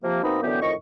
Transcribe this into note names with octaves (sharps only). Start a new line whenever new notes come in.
C3 F3 A#3
B2 A#3 C4 D#4 D#5 B5
F#2 D3 E3 B3 G4
F2 A2 D#3 D#5 C#6